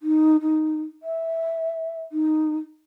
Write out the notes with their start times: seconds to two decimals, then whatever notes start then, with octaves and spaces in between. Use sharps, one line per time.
0.01 D#4
0.41 D#4
1.03 E5
2.12 D#4